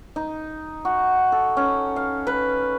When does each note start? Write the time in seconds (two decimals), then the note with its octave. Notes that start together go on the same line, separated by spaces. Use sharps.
0.16 D#4
0.85 F#4
1.32 A4
1.57 C#4
1.96 F5
2.27 B4